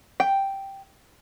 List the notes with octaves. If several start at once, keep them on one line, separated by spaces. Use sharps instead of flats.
G5